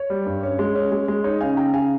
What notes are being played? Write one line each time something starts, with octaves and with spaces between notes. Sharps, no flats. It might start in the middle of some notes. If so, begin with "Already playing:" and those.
Already playing: C#5
G3
G2
C#4
G#3
C#4
G#3
G#3
D#4 C#5
C#3 F5 G#5
C#3 G5 A#5
C#3 F5 G#5